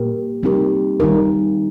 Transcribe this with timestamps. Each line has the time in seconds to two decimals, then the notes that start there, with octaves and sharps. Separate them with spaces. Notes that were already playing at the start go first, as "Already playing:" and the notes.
Already playing: A#2 A#3 G4 A#4
0.43 G3 C4 D#4 G4 A#4
1.00 D#3 G3 D#4 A#4